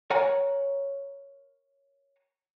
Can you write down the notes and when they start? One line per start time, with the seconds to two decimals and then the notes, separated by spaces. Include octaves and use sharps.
0.10 A#4 C#5 F#5 G#5 A#5